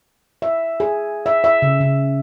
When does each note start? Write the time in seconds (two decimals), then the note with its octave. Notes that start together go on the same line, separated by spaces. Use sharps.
0.42 E5
0.80 G#4
1.26 E5
1.44 E5
1.62 C#3
1.81 C#3